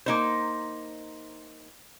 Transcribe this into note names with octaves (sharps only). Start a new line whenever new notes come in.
A#3 D#4 C5